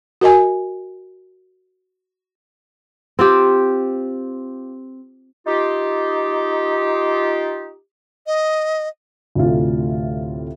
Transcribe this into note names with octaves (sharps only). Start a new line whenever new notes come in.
F#4 A#4 D#5 G#5
C4 F4 G4
D#4 F4 G4
D#5
D2 A2 C3 F4